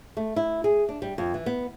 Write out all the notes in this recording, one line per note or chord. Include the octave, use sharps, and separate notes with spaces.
A3
E4
G#4
D4
G3
F2
E3
B3